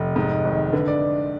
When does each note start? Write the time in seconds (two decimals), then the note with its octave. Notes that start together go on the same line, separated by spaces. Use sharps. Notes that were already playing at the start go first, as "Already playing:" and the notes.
Already playing: F1
0.16 G#2
0.45 G#1
0.73 D3 B4
0.88 D5